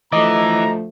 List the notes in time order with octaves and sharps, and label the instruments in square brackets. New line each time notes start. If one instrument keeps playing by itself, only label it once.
[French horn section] D2 F3 A3 [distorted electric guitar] E3 [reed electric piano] D#5 D6 [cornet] A#5